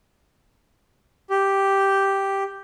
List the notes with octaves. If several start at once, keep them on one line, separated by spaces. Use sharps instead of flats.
G4